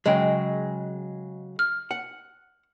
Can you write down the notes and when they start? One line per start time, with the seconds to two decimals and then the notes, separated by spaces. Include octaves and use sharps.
0.06 C#3 F#3 G#3 D#5 G5
1.59 F6
1.91 F#5